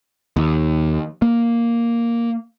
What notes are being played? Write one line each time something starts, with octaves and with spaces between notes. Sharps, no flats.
D#2
A#3